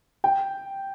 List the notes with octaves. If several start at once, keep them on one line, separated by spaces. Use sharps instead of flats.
G5